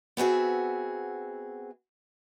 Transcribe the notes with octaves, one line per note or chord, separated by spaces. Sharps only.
B3 C4 F#4 G#4 E5